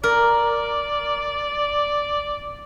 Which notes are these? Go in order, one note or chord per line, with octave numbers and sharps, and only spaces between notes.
A#4 D5